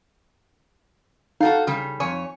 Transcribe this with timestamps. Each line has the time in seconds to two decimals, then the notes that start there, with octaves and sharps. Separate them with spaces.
1.41 D#4 F#4 A4 F5
1.67 C#3 G3
2.00 F2 C#5 G#5